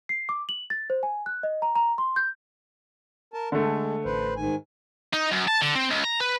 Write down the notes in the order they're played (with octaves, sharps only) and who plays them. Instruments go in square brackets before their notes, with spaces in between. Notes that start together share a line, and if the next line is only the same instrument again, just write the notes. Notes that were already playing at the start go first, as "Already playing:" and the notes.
[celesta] C7
D6
F#7
A6
C5
G#5
F#6
D#5
A#5
A#5
C6
G6
[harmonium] A#4 A5
[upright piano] D3 A3 [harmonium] G#3
[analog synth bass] A1 [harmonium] B4 C5
[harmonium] G#2 D#3 G#5
[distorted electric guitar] D#4
F#2
A5
D3
C4
C#2
A#5
B4